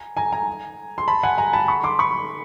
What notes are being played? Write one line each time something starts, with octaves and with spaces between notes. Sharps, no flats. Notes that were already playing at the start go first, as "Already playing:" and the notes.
Already playing: G#5 A#5
G#5 A#5
G#5 A#5
C6
A5 B5
F#5 G#5
G#5 A#5
A5 B5
B5 C#6
C6 D6
B5 C#6